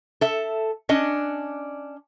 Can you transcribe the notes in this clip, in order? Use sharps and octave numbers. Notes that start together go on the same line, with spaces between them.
A4 E5
C#4 D4 D#5